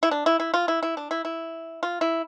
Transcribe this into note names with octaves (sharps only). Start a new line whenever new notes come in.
E4
D4
E4
E4
F4
E4
E4
D4
E4
E4
F4
E4